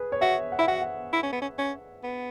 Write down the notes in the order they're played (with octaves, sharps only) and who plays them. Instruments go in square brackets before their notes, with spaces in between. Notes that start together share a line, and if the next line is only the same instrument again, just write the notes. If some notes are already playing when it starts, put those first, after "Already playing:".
Already playing: [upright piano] G#4 B4
C#5
[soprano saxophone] F#4 [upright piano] E5
[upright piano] F#5
[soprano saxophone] E4 [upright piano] E5
[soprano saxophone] F#4 [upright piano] F#5
[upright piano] F#5
[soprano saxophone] E4
C#4
B3
C#4
C#4
B3